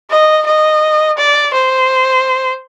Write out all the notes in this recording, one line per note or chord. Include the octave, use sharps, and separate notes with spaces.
D#5
D#5
D5
C5